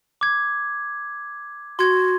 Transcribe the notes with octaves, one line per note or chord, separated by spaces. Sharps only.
D6 G#6
F#4 C6 G#6